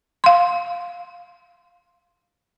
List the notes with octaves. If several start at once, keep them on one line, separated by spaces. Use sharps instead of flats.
F5 C6